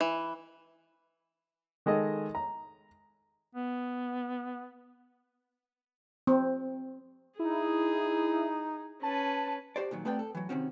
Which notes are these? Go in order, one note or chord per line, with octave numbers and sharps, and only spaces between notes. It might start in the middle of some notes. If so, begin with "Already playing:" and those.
E3
D#3 G#3 A4 D#5
A#5
B3
C4
D#4 E4 G#4
C#4 B4 A5
F#4 G4 C5 D5
A#2 D#3 F#3
A3 B3 C4 B4 D5 G5
A4
E3 F#3
C3 D#3 C4 C#4 F#4